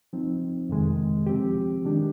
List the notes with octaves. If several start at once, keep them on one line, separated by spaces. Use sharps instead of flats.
F3 C4 D#4
F2 C3 D#3 G#3
F3 C4 G4
D#3 G#3 D4 G4